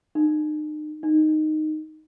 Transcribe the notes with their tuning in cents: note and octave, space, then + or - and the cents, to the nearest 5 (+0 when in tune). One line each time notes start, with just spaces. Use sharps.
D#4 -40
D#4 -10